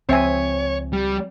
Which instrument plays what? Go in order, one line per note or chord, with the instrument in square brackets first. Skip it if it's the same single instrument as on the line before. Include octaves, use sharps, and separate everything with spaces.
[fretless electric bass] C#2 F3 [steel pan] C4 E5 G#5 [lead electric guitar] C#5
[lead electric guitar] G3